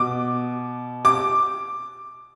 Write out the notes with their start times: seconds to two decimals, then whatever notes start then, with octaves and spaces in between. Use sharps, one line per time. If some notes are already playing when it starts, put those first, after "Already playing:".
Already playing: B2 D6
1.05 D6